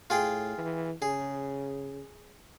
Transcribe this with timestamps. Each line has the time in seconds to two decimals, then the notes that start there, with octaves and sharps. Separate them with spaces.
0.10 A2 F4 G#4 G5
0.58 E3
1.02 C#3 G#4